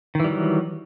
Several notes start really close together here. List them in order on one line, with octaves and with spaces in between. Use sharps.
D#3 E3 G3 F#3